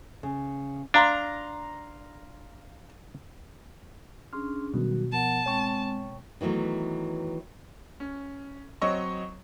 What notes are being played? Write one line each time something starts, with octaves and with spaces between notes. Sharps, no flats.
C#3
D4 F5 A#5 C6
C#4 D4 G#4 C6 F6
B2 D#3 F#3 G3 F#4
F3 B3 A#4 F#5 A5
G#3 C4 C#5 G5 C#6
D#3 E3 F#3 A3 B3
C#4
F#3 C4 C#5 D#5 C#6